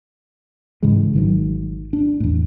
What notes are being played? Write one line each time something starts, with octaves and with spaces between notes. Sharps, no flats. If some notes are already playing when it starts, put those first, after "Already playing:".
G#2 C#3 E3 G#3
G#1 D#3 F#3
D4
E2 A2